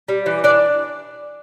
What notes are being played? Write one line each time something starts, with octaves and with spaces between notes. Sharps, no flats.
G3
E3
D4 D5